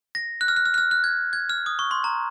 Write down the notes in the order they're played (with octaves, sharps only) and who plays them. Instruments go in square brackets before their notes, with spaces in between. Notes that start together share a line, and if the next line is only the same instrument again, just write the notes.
[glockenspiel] A#6
F#6
F6
F#6
F6
F#6
F6
F#6
G#6
G#6
F6
D#6
C#6
C6
A#5